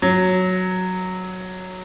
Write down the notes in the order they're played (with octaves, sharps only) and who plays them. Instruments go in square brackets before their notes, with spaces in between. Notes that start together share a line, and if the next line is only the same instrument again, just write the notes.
[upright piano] F#3